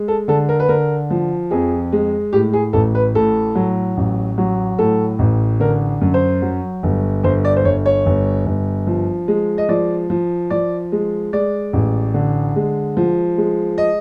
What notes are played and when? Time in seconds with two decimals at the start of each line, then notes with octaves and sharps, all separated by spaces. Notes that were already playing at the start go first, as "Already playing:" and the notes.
Already playing: G#3
0.08 A4
0.28 D3 A4
0.49 A#4
0.60 B4
0.69 D3 A#4
1.10 F3
1.51 F2 G#4
1.92 G#3
2.33 A2 G4
2.53 G#4
2.73 A1 A4
2.95 B4
3.15 A2 A4
3.55 F#3
3.97 A1
4.38 F#3
4.79 A2 A4
5.19 A1
5.60 D3 A#4
6.01 F#2
6.14 C5
6.42 F#3
6.83 G1
7.23 G1 C5
7.45 D5
7.57 C5
7.65 G1 C#5
7.86 C#5
8.06 G1
8.46 G1
8.87 F3
9.28 G#3
9.58 D#5
9.69 F3 D5
10.10 F3
10.50 F3 D5
10.92 G#3
11.33 G#3 D5
11.73 A1
12.14 D3
12.56 G#3
12.97 F3
13.38 G#3
13.78 D#5